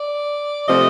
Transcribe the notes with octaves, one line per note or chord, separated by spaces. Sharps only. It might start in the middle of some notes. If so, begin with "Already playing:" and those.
Already playing: D5
C3 F3 A3 C4 D#5